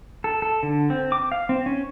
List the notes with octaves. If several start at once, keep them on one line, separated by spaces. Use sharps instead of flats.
A4
A4
D3
C4
D6
F5
C4
C#4